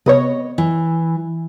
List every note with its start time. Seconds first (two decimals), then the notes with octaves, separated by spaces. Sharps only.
0.06 C3 B3 C#5 D#5
0.58 E3